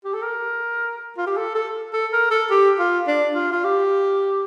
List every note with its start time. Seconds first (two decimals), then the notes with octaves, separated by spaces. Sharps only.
0.05 G4
0.14 A4
0.23 A#4
1.18 F4
1.27 G4
1.37 A4
1.55 A4
1.93 A4
2.13 A#4
2.31 A4
2.50 G4
2.79 F4
3.08 D4
3.35 F4
3.52 F4
3.64 G4